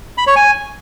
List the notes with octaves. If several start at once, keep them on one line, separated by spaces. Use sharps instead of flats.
B5
C#5
G#5